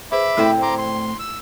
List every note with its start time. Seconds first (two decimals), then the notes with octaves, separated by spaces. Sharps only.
0.12 G#4 B4 C5 E5 B5 D6
0.37 D2 A2 A3 C4 E4 A4
0.62 A#5 C6 D6
0.78 C6
1.19 E6